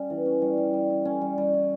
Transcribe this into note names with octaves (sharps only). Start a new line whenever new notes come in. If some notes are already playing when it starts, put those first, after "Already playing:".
Already playing: G3 C#4
E3
C#4
G3
G3
G3
E4
C#4
G3
G3
E4